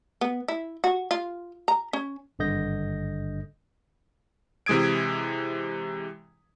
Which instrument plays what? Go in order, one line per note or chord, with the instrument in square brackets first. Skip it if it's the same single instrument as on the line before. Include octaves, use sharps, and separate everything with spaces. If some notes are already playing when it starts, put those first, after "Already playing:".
[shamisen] B3
E4
F#4
F4
A#5
C#4
[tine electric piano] G#1 G2 D3 D#5 G6 A#6
[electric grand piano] C3 E3 G#3 D#6 G#6 D7